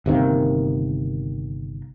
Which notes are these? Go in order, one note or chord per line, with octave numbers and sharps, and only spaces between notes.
G1 C3 D#3 A#3